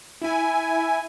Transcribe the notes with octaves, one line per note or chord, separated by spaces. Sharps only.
E4 G#5